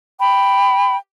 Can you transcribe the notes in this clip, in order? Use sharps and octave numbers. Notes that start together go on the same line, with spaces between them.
G5 B5